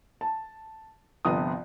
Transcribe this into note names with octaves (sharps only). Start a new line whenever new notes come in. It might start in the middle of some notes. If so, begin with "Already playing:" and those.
A5
G1 C3 F3 B3 D#6